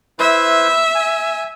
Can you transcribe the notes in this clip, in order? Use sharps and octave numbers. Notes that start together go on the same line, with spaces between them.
E4 B4 C5 E5
G#5